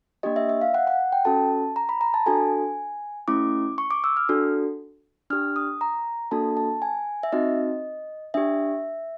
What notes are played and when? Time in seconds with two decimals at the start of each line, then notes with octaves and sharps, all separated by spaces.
0.23 A#3 D4 G4 D#5
0.36 E5
0.49 E5
0.61 F5
0.74 F#5
0.87 F#5
1.13 G5
1.25 C#4 F#4 A4 A5
1.76 A#5
1.89 B5
2.01 A#5
2.14 A5
2.26 D4 F#4 A4 G#5
3.28 A3 C#4 E4 D6
3.78 C#6
3.91 D6
4.04 E6
4.17 F6
4.29 D4 F#4 A4
5.30 D4 G4 F6
5.56 D#6
5.81 A#5
6.31 A#3 D4 F#4 A4 A5
6.57 A5
6.82 G#5
7.23 E5
7.32 C4 D#4 F#4 D#5
8.34 D4 G4 E5